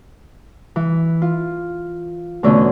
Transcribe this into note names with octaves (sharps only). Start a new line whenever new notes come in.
E3
F4
E2 B2 D3 A3 C#4